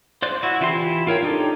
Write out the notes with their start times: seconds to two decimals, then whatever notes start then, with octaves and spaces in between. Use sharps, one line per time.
0.22 C5 D5 F#6
0.43 E4 F#4
0.61 E3 E4 F4 G4 C6
1.07 F4 A#4 C#5 G5
1.23 D4 D#4 G4 A4